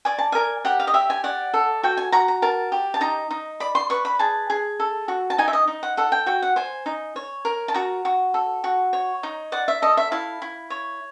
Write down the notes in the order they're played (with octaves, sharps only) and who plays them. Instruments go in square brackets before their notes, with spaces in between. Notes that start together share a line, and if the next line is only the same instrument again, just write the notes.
[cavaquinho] D5 G#5
A5
A#4 G#5
G4 F#5
F5
D#5
G4 E5
G#5
D5 F#5
A4
F#4 G5
G#5
F#4 A#5
A#5
A#4 A5
G4
A5
D#4 A#5
D#4
D5 B5
C6
B4 C#6
B5
G#4 A5
G#4
A4
F#4
A5
D#4 G#5
E5
D#5
D#4
F#5
A4 F#5
G5
F#4 G5
F#5
C5 G#5
D#4
C#5
A#4
A5
F#4 A#5
F#4
A4
F#4
C#5
D#4
D5 F#5
E5
A4 D#5
E5
E4 F5
E4
C#5